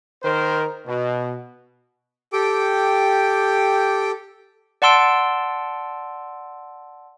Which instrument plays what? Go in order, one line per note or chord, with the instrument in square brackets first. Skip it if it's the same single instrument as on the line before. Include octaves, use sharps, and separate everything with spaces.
[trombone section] D#3 A#4 C5
B2
[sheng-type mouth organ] G4 A4 G5 D6
[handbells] D5 F#5 A5 C6 E6 D7